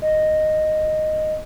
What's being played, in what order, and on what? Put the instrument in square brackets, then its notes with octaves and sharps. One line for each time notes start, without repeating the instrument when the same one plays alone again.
[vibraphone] D#5